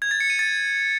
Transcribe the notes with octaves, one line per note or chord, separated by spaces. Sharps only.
G#6
A6
C#7
D#7
A6